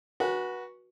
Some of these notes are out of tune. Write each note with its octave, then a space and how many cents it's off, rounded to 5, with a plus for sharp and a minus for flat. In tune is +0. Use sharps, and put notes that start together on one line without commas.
F#4 +0 B4 -30 G#5 -15